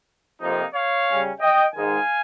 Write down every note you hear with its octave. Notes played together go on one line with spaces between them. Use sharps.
F2 C3 F3 A#3 D#4
C#5 F5
C#3 G3 C#4
D#5 G5
G#2 D#3 G#3 D#4 F5 G#5